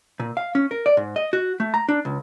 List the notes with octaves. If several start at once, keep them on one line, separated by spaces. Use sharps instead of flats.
A#2
F5
C#4
A#4
D5
G#2
D#5
F#4
A3
A#5
D4
C#2